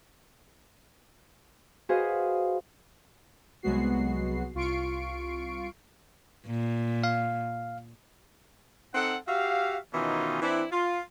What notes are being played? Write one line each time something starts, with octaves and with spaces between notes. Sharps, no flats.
F#4 G#4 B4 C5 D#5 F5
C2 F#3 G#3 B3 F#4 C7
C2 F4 C#6 C7 D7
A#2
F5
C4 D#4 A4 F#5
F#4 G4 E5 F5
B2 D#3 E3 C#4 D#4 F4
E3 C4 D4 E4
F4